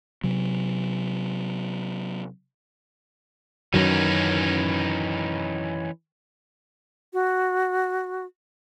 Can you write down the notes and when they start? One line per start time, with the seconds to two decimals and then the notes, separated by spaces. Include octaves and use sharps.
0.24 C3 F#3
3.74 F#2 D#3 E3 F#3 C#4 D#4
7.13 F#4